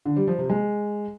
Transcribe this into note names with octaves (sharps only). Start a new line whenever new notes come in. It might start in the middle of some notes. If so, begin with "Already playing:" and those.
D3
G3
F3
C3
G#3